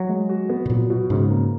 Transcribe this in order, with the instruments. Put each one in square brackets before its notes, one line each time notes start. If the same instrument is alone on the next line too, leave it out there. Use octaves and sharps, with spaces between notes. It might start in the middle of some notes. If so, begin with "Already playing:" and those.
Already playing: [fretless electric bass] F#3
[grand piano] G#3
F#4
B3
[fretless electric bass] B2
[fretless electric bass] A#2 [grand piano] F#3
[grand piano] B2
[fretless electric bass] G#2 [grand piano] C#3
[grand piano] A#3